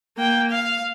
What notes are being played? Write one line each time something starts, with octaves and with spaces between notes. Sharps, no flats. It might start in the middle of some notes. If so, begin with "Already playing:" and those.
A#3 G5
F5